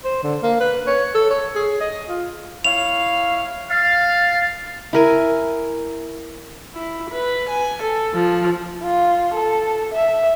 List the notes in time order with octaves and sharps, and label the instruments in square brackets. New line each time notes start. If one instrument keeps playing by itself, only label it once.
[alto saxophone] C5
D3
A#3
B4
C#5
A4
C#5
G#4
D#5
F4
[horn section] E4 C#5 F5 [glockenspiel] F7
[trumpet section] F5 [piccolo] A6
[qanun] E4 A#4 G#5
[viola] E4
B4
G#5
A4
F3
[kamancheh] F4
A4
E5